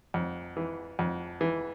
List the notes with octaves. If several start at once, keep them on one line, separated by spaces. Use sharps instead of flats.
F2
E3
F2
E3